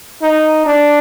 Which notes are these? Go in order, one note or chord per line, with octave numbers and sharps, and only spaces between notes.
D#4
D4